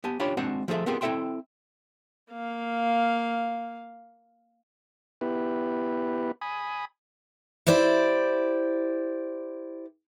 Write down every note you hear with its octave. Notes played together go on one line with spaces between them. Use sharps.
B3 G4 G#5 A5
C#4 D4 F4 G4 C#5 B5
G#3 C4 D4 F#4 F#5
F3 A3 G#4 A4 E5
B3 C4 F4 G4 G#4 A#4
C4 E4 A4 E5 G5 C6
A#3 F5
B3 E4 G4 B4
G#5 B5 D#6
E4 G4 C5 D5